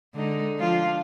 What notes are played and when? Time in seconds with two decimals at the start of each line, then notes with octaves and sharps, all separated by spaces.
0.15 D3 G#3 D#4
0.58 F3 D4 F4